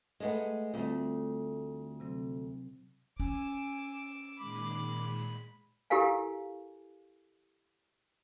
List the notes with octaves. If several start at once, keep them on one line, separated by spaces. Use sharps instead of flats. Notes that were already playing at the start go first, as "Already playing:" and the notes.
G#3 A3 B3
D2 G3 A3 C4 F4
C3 F#3 C4
C#4 G#5 D6 E6
A#2 D#3 G#3 B5 D6
E4 G4 A4 A#4 F5 G#5